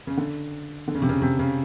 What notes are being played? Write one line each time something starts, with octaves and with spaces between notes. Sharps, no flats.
C#3
D3
D3
C#3
C3
C#3
C3
C#3